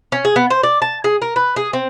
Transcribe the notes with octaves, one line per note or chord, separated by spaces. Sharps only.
C#4
G#4
B3
C5
D5
A5
G#4
A#4
B4
G#4
C4